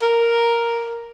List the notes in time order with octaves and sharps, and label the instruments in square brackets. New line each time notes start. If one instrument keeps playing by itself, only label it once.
[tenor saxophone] A#4